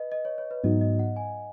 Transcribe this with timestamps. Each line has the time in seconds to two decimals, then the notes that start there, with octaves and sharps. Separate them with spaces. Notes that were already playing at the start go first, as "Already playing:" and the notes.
Already playing: B4 D#5
0.12 D#5
0.25 C#5
0.38 C#5
0.51 B4
0.63 G#2 F#3 B3 D#4 F#4 D#5
0.81 D#5
0.99 F#5
1.16 G#5